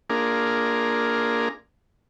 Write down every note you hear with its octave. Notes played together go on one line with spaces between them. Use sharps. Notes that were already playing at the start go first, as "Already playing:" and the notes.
A#3 D4 F4 G#4 A#4